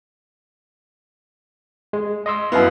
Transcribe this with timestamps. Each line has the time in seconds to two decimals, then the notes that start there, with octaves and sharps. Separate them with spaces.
1.93 G#3
2.26 D#5 C6 E6
2.52 F#2 B3 E4 F5